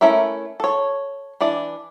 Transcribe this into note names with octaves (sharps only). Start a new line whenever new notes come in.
A3 C#4 E4 A#4 E5
A4 C#5
E3 D4 D5